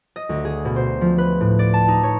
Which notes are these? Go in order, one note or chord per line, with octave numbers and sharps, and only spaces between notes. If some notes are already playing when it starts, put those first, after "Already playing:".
D#5
D2
G#4
B2
C5
F3
B4
A2
D5
A5
D#4
C#5